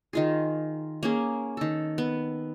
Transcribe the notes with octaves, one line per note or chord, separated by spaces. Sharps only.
D#3 F4 G#4
A#3 C#4 G#4
D#3 A4
B3